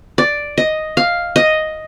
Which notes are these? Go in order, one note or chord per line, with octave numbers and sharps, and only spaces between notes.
D5
D#5
F5
D#5